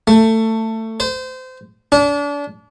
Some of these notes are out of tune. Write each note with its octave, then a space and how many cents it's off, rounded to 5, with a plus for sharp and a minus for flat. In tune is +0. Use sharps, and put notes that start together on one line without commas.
A3 +20
C5 -25
D4 -35